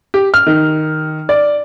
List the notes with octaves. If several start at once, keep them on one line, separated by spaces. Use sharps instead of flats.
G4
F6
D#3
D5